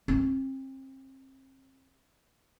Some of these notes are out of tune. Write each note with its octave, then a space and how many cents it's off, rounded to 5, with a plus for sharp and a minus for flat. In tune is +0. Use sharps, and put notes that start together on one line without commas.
C4 +35